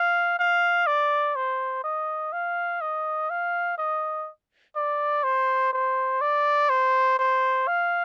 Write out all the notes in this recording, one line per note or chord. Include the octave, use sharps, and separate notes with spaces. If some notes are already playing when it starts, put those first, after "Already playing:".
Already playing: F5
F5
D5
C5
D#5
F5
D#5
F5
D#5
D5
C5
C5
D5
C5
C5
F5